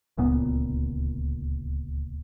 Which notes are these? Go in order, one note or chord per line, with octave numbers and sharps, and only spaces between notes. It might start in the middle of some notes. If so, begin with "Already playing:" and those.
D1 C#2 A#2 B3